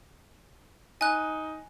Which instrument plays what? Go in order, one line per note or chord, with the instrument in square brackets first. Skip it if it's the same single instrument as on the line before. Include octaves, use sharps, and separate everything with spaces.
[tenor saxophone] D#4 [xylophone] G#5 F#6